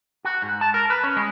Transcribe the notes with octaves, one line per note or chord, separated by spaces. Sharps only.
F#4
G#2
A5
A#4
B4
C#4
G#3